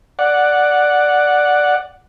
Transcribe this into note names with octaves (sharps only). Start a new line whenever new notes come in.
D5 F#5